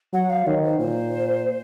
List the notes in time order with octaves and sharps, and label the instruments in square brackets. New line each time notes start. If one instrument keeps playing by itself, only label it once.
[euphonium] F#3 [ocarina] F#5
[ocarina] F5
[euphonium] D#3 [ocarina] C#5
[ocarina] C5
[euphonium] A#2 [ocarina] C5